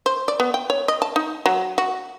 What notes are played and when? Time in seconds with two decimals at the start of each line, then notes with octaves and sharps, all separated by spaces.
0.06 C5
0.28 D5
0.40 B3
0.54 G5
0.70 C#5
0.88 D#5
1.02 A5
1.16 D#4
1.46 F#3
1.78 F#4